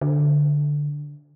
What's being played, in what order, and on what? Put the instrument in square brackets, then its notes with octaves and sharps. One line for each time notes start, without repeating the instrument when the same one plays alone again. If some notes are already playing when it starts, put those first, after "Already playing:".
[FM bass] D3